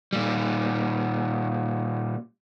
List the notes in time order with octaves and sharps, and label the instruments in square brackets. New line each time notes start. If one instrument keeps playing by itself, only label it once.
[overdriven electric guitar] A#2 G3